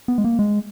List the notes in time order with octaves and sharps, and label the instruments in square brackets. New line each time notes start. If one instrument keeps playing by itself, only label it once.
[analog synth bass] B3
G#3
A#3
G#3